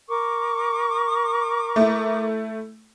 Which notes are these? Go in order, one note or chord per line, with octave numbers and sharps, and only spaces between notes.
A#4 C#6 D6
A3 E4